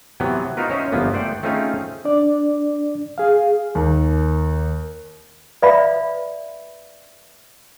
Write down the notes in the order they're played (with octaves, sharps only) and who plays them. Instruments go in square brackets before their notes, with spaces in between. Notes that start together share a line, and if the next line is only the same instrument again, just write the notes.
[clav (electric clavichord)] C3 E3 F#3 B3
D#4 F4 F#4 A#4 B4
C#4 C5 C#5 D#5 E5
G1 E3 F3 A#3 B3
A3 C5 D5 F#5 G5
A3 C4 C#4 D#4 F4 G#4
[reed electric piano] D4 D5
G#4 F5
[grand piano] D#2
[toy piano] B4 D5 E5 F5 B5